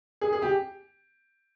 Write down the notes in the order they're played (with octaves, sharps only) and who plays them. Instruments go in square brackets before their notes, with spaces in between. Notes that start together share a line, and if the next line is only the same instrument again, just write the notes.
[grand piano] G#4
G#4
G4